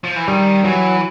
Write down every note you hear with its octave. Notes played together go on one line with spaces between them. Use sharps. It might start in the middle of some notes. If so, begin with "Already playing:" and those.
F3
E3
D#3 G3
E3 F#3